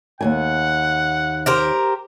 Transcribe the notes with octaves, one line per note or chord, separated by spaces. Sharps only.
D#2 G#2 F#5 G#5
G4 A#4 C5